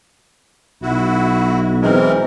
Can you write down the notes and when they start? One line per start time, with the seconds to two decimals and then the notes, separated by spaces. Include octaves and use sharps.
0.82 B1 E4 F#4
1.82 E3 G#3 C4 A#4